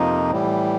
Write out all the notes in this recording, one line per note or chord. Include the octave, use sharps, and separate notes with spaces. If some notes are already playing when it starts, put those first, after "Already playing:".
Already playing: F2 C3 F3 A#3 D#4
A2 E3 G3